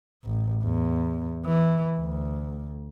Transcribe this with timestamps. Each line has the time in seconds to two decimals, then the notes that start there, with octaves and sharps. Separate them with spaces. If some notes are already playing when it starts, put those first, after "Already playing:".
0.24 A1
0.63 E2
1.46 E3
1.98 D2